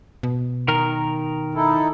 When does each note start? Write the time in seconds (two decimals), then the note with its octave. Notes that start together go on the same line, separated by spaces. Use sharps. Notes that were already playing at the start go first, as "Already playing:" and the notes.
0.23 B2
0.68 D#3 A#4
1.55 D#4 E4 A4